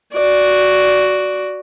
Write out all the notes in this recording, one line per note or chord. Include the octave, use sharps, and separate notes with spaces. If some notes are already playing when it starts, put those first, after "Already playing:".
F#4 D5